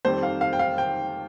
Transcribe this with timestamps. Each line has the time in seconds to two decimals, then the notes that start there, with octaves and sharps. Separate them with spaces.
0.05 F2 D#3 G3 C4 C5
0.23 F5
0.41 F5
0.53 G5
0.59 F5
0.78 G5